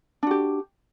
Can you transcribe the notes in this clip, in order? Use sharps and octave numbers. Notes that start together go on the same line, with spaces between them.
D4 F#4 G4